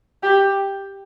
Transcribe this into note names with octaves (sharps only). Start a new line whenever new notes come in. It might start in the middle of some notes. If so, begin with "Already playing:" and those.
G4